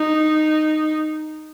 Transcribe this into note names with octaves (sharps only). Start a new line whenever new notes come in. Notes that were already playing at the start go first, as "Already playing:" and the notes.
Already playing: D#4